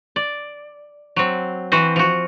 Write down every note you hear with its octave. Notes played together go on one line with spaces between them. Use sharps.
D5
F#3 C4
E3 C4 F#4 C5
F3 F#4